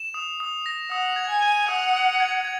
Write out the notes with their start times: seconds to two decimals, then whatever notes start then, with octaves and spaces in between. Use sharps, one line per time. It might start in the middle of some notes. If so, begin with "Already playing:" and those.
Already playing: E7
0.14 D#6
0.40 D#6
0.66 A#6
0.91 F#5 D#6
1.16 G#6
1.29 G#5
1.42 D#7
1.68 F#5 D#6
1.93 D#6
2.20 G#6
2.45 G#6